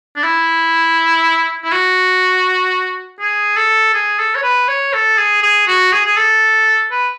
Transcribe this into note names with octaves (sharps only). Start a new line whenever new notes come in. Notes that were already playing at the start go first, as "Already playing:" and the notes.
D4
E4
E4
F#4
G#4
A4
G#4
A4
C#5
B4
C#5
A4
G#4
G#4
F#4
G#4
G#4
A4
B4